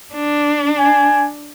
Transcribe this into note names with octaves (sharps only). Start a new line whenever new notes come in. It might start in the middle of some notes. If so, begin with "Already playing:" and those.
D4
G#5